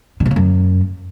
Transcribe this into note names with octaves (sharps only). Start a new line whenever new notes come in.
D3
C3
C#3
F#2